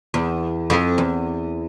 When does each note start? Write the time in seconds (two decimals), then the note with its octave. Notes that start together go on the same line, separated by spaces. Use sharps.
0.14 E2
0.70 F2
0.98 E2